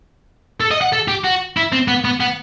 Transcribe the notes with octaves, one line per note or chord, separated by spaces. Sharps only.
A4
D#5
F#5
A4
G4
F#4
E4
C4
B3
B3
B3